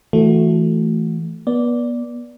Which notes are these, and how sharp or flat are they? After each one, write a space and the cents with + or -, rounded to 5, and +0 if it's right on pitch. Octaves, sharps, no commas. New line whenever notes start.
E3 +0 A3 +0 F#4 -25
B3 -30 D5 -10